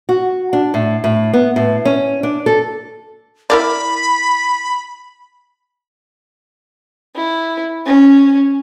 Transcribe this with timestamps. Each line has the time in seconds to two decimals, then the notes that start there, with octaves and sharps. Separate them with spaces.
0.09 F#4
0.53 D4
0.74 A2
1.04 A2
1.33 B3
1.56 A2
1.85 C#4
2.23 D4
2.46 A4
3.50 E4 A#4 D5 B5
7.15 E4
7.86 C#4